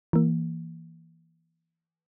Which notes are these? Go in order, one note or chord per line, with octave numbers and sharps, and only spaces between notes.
E3 A#3